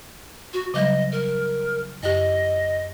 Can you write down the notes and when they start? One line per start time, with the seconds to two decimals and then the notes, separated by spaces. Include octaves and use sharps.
0.53 F#4
0.74 C#3 F#3 G3 D#5
1.12 A#4
2.03 F#2 G4 D#5